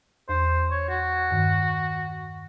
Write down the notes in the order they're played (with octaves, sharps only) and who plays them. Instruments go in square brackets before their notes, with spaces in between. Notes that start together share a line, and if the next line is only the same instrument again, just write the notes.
[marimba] E2 [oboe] C5
[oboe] C#5
F#4
[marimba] G2 D#3